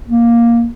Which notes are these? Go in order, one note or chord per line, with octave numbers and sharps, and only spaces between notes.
A#3